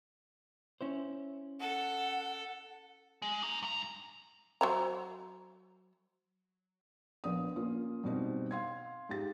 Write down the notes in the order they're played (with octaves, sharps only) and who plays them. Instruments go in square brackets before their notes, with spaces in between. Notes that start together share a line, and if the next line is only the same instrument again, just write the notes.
[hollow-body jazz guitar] C#4 E4 C5
[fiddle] A4 [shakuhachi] F#5
[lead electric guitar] G#3
D4 A#5
G2 A#5
[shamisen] F#3 C5 A#5
[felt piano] A#1 B3 D#6
A#3 C#4 F4
G2 B2 C4 D#4
F5 C6 G#6
G#2 G4 A6